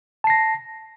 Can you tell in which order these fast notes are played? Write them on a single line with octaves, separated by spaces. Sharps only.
A5 C7 A#6